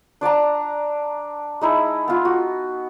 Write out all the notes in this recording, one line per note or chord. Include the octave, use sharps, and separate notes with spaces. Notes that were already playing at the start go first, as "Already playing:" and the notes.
D4 D5 A5 A#5
G#3 D#4 E4
B3 F4
F#4